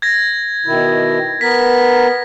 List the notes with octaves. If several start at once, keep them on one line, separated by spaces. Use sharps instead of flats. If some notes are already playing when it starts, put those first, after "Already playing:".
G#6 A#6
B2 D#3 E4
B3 A#4 B6